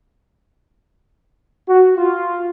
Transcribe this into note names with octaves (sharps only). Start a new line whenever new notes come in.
F#4
F4